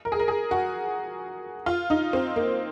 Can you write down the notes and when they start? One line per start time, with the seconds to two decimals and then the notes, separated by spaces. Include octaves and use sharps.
0.05 A#4
0.12 G#4
0.19 A#4
0.28 G#4
0.51 F#4
1.66 F4
1.90 D#4
2.13 C4
2.36 A#3